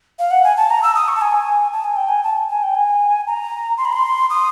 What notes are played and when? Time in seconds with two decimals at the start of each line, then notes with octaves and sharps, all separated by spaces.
0.19 F5
0.31 F#5
0.44 G#5
0.57 A5
0.70 A#5
0.83 E6
0.95 D#6
1.08 C#6
1.16 A5
1.21 G#5
1.73 A5
1.84 G#5
1.96 G5
2.09 G#5
2.24 A5
2.50 G#5
2.63 G5
2.75 G#5
3.27 A#5
3.78 C6
3.85 B5
3.93 C6
4.30 D#6